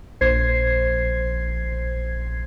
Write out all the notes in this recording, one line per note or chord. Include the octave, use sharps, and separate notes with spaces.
A#1 C5 G#6 C7